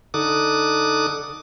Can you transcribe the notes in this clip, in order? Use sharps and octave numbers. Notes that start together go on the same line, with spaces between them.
D3 D#4 A4 D6 D#6 F#6